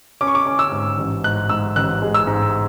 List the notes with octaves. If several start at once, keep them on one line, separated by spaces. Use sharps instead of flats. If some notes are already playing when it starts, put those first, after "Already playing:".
C#4 D6
C#6
D6
C#4
E6
G#2
A1
G#2 F#6
G#2 E6
A1 F#6
G#3
E6
G#2